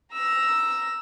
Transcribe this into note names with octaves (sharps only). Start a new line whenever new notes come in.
A#5 E6